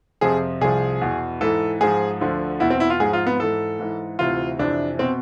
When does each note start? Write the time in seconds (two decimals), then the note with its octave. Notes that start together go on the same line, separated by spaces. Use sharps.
0.21 F2 C3 F3 G#4
0.61 C2 C3 F3 G#4
1.01 E2 B2
1.41 G#2 E3 A4
1.81 G#2 F3 G#4
2.21 D2 D3 F3
2.60 E2 B2 E4
2.70 C4
2.80 E4
2.90 F4
3.00 G#2 F3 G#4
3.13 F4
3.27 B3
3.40 G#2 E3 A4
3.79 G#2 E3
4.19 D2 C3 E3 F4
4.59 F2 C3 E3 D4
4.99 B2 C4